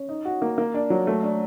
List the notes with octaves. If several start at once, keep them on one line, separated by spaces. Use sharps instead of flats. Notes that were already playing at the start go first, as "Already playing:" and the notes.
Already playing: C#4
D#4
F#4
A#3
A#3
D4
F#3
A3
D4